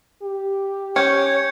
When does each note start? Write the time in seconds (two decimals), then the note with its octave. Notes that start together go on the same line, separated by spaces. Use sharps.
0.22 G4
0.96 C#4 C#5 G5 G6 G#6 C#7